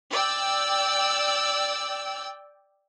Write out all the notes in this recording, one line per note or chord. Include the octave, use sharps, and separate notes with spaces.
D5 G5 E6